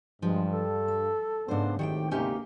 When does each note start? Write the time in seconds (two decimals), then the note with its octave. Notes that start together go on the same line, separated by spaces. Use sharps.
0.22 G2 F3 G#3
0.51 A4
0.88 E5
1.48 G#2 C#3 B3 D4 C5
1.79 G#1 A2 D#3 G4 F#5 G5
2.11 D2 G#2 C3 A#3 C#4 D#4 G4